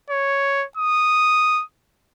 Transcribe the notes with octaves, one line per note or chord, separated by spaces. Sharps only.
C#5
D#6